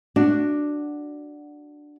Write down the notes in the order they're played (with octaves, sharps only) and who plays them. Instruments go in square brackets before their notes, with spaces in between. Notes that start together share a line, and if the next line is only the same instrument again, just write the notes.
[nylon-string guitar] D4 F#4